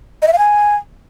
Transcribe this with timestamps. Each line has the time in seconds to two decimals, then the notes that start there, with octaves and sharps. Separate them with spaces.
0.22 D#5
0.27 E5
0.33 F5
0.38 G#5